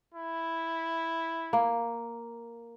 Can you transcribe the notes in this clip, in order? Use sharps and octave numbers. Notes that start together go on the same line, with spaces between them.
E4
A#3